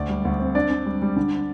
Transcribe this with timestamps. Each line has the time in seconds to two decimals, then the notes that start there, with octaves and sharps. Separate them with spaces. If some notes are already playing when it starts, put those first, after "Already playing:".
Already playing: D2 D5
0.09 G3
0.25 D2
0.40 C4
0.55 D4 D5
0.70 D4
0.86 G3
1.02 G3
1.16 D3